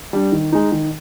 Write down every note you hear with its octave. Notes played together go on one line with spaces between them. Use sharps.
G3 D4
D#3
G#3 D#4
D#3